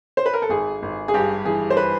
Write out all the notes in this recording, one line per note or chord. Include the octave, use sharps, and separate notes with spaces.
C5
B4
A#4
A4
G#1 G#4
G#1
G#4
G2 G4
E3 G#4
C5
B4